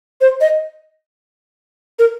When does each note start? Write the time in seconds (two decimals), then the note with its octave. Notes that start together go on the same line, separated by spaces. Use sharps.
0.21 C5
0.41 D#5
1.99 A#4